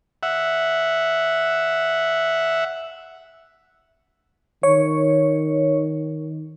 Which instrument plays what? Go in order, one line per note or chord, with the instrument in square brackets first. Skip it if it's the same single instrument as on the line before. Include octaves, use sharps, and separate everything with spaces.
[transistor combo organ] E5 F#5
[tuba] D#3 [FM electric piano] C#5